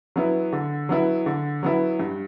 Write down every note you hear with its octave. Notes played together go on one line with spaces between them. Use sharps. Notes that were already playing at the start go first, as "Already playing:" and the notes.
F#3 B3 E4
D3
F#3 B3 E4
D3
F#3 B3 E4
G2